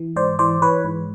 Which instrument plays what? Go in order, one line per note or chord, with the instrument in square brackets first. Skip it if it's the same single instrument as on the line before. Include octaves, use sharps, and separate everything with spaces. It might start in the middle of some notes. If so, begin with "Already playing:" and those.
Already playing: [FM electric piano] E3
G#2 C5 D5
E3 C5 D5
E3 B4 C#5
G#2